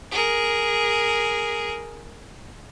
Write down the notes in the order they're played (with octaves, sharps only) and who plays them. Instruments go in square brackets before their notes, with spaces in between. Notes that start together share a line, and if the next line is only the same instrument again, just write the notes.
[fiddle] G#4 A#4